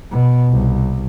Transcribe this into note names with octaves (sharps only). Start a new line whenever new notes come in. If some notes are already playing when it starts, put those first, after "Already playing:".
B2
C2